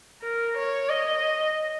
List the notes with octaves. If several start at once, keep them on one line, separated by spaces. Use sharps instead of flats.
A#4
C#5
D#5